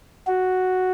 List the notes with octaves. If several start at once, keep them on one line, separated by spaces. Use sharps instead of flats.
F#4